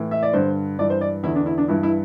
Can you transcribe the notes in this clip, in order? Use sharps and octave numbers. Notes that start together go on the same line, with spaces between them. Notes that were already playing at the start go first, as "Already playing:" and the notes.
Already playing: A2 E3
E5
D5
G2 D3 C5
G2 E3 D5
C5
D5
E2 D3 E4
D4
E4
D4
G2 E3 E4
E4